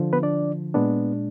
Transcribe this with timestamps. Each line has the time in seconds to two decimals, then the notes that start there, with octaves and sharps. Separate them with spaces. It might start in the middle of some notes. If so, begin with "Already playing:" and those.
Already playing: D3 F3
0.13 B3 B4
0.23 D4 D5
0.74 A#2 G#3 B3 D4